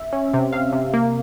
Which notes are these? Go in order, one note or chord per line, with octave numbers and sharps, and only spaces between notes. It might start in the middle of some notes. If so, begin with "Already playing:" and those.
Already playing: E5
C#4
C3
C3 F5
C3
A#3